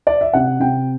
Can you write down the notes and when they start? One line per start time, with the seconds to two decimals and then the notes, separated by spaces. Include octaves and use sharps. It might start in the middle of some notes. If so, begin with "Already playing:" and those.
0.07 D5
0.21 E5
0.34 C3 F#5
0.60 C3 G5